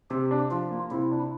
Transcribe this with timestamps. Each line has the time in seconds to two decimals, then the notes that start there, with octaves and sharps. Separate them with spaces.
0.10 C3 G4
0.31 D4
0.51 F3 F4
0.71 A#3
0.91 C3 E4
1.11 D4